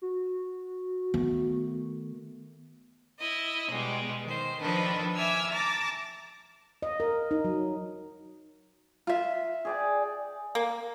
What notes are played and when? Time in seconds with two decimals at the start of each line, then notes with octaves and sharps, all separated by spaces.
0.02 F#4
1.14 D#3 A3 B3
3.19 E4 D#5
3.69 B2 G3 G#3
4.25 D#3 C5
4.60 D#3 F3 D4 A4 B4
5.15 E5 G#5 D6 E6 F6
5.49 A5 A#5 D6 A6
6.82 D#5
7.00 A#4
7.31 D#4
7.44 F#3
9.07 F4 E5
9.65 G#4 D5 G5
10.55 A#3